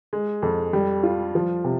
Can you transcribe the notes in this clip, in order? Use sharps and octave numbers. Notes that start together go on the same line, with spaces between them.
G#3
F2
G3
F4
F3
C3